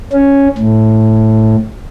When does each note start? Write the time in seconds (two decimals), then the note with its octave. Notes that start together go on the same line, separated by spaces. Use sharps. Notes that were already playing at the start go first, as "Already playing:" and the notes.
0.12 C#4
0.58 A2